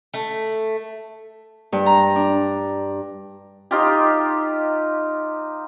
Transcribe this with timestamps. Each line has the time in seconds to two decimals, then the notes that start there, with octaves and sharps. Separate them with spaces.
0.14 A3
1.72 G2
1.86 A#5
2.16 D4
3.71 D#4 F4 G4